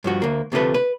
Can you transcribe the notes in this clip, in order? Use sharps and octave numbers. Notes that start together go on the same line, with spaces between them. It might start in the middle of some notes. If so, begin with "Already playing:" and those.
G2 F3 F#4
D2 A#3
D2 C3 F3 A3 B4
B4